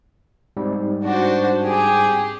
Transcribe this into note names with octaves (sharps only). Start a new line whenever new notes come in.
G#2 G3 C4
D4 F#4 C5
G4 G#4